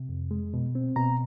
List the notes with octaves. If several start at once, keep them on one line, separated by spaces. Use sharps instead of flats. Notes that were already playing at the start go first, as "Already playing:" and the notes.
Already playing: C3
F2
G#3
B2
C4
B2 A#5